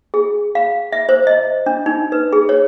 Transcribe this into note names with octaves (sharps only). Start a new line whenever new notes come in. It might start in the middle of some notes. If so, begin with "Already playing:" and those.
G#4
F5
E5
C5
D#5
D4
D#4
B4
G#4
C#5